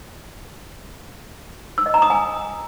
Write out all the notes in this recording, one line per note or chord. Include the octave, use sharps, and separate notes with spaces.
E6
D#5
A#5
D#6
G#5